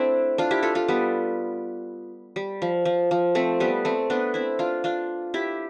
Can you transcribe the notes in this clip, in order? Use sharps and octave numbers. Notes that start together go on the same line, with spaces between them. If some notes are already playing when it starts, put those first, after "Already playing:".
Already playing: A3 C4 D4 E4
D4 F4
E4 G4
F4 A4
F4 A4
G3 B3
G3
F3
F3
F3
A3 C4
G3 B3
A3 C4
B3 D4
C4 E4
D4 F4
D4 F4
E4 G4